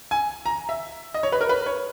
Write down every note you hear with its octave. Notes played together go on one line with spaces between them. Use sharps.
G#5
A#5
E5
D#5
C#5
B4
A#4
B4
C#5